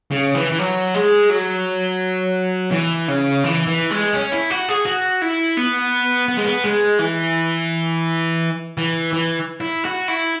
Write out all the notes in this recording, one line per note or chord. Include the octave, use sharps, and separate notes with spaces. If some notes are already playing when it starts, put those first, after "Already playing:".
C#3
E3
E3
F#3
G#3
F#3
E3
C#3
E3
E3
G#3
C#4
E4
F#4
G#4
F#4
E4
B3
B3
G#3
B3
G#3
E3
E3
E3
E4
F#4
E4